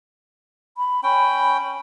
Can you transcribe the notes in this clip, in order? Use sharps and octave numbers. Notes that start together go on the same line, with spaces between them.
B5
C#4 G5 B5